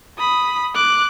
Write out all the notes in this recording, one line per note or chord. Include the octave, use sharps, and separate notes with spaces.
B5 D#6
D6 F#6